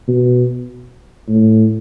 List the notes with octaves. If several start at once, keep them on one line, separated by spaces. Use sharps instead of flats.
B2
A2